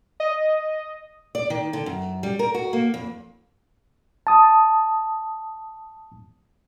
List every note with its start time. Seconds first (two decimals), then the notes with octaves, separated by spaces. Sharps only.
0.20 D#5
1.35 D5
1.50 D#3
1.73 D3
1.86 F#2
2.23 G3
2.39 A#4
2.54 F#4
2.73 A#3
2.94 F2
4.27 A5 D#6